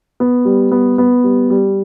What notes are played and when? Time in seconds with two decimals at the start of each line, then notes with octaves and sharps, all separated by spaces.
0.20 B3
0.45 G3
0.72 B3
0.98 B3
1.24 G3
1.50 G3